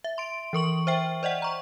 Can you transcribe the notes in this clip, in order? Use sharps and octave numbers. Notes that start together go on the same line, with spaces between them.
E5
C6 D7
E3 A#4 C#6 F#7
C5 E5 G5
C5 D5 D#5 F#5
A#5 C#6